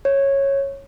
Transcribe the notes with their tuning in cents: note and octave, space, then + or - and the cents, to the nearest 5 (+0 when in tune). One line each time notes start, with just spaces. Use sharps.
C#5 -10